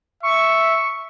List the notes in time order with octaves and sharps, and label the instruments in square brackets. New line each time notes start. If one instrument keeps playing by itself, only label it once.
[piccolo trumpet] E5 [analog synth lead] C#6